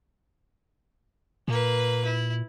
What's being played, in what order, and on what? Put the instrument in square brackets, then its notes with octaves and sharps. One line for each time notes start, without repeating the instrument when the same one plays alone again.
[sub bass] A#2 [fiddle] A#3 B4
[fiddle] E4